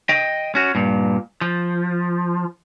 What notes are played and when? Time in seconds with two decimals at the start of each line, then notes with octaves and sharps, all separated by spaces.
0.09 D#5 G5
0.55 C#4 F#4
0.75 G2 A#2
1.41 F3